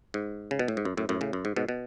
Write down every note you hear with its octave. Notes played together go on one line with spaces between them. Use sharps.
G#2
C#3
B2
A2
G#2
F#2
F#2 A2
F#2 A2
A2 C#3
F#2
G#2
G#2 B2
B2